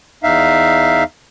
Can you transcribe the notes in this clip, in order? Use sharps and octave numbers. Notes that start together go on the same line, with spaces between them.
E2 D#4 E5 F5